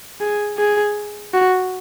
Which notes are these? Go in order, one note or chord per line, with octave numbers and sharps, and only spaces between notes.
G#4
G#4
F#4